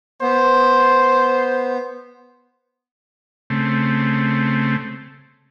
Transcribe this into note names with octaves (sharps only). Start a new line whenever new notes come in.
B3 C5
C#3 A3 C4